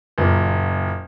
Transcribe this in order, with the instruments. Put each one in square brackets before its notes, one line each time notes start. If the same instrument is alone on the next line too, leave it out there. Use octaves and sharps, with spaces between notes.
[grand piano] F#1 A#2